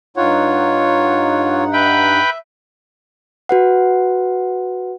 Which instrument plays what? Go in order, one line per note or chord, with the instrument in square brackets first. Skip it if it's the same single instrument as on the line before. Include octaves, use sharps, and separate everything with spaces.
[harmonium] G2 D#4 F#5 [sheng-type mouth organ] F4 C#5
[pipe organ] B4 G5 B5 [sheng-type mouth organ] E5
[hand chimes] F#4 B4 F#5